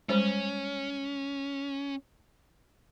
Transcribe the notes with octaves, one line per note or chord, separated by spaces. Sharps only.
G3 G#3 C#4 C5